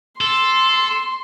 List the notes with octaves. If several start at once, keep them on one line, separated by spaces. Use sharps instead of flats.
A4 C6